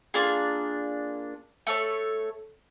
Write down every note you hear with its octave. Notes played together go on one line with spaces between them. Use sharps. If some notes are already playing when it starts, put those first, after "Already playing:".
A#3 D4 F4 G#4
A3 A4 C#5